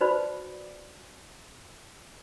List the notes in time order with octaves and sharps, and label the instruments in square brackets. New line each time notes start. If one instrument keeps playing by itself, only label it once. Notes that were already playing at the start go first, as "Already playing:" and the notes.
[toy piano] D#4 F#4 B4 C5 D5 B5